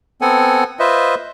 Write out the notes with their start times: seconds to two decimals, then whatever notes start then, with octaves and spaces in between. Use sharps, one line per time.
0.21 B3 C4 A4 F#5 G#5
0.79 F4 B4 C5 D#5 E5